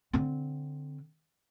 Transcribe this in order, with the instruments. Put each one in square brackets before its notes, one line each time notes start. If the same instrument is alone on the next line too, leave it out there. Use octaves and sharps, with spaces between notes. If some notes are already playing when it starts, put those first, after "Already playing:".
[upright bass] D3 C4